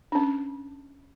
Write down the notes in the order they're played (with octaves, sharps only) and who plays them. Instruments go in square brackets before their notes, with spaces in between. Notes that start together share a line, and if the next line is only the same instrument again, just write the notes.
[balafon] C#4 D4